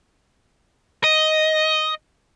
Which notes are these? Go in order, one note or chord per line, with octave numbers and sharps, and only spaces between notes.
D#5